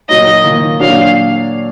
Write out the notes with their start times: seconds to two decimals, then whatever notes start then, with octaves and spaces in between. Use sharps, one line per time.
0.09 A#2 F#3 A#3 D#4 D#5
0.44 D#3 A#3 F4
0.80 A#2 F#3 D4 F5